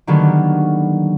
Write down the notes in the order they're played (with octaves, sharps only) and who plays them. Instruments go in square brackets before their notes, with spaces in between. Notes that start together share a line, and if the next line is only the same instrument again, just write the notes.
[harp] D3 D#3 F#3 G3 A#3 B3